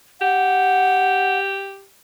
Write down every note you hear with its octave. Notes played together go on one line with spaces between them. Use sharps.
G4 F#5